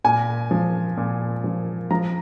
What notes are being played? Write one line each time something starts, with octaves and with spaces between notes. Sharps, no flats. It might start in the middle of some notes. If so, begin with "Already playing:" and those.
A#2 G#5
F3
A#2
F3
F3 A#5